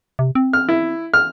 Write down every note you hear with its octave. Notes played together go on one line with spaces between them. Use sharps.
C3
C4
F6
E4
F6